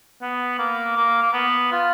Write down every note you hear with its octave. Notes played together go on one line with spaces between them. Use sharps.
B3
A#3
A#3
A#3
B3
F4